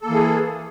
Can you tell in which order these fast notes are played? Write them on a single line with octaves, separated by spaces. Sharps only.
A4 A#3 E3 G#4